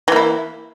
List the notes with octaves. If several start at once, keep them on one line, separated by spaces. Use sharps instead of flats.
E3 A#3 E4